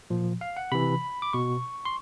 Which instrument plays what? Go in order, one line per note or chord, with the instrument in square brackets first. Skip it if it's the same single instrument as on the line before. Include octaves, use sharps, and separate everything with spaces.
[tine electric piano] A#2 F3
F5
F#5
C3 E3 B5
D6
B2 C#6
C6